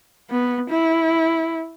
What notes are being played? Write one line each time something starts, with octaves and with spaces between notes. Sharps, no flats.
B3
E4